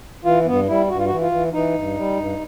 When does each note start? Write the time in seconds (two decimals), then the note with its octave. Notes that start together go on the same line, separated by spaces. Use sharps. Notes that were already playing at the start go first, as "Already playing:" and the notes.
0.24 E3 F4
0.45 G2 B3
0.67 G3 E4
0.89 G2 F#4
0.97 F4
1.06 E3 F#4
1.21 F4
1.32 E3
1.53 E3 D#4
1.75 G2
1.96 G3
2.18 G2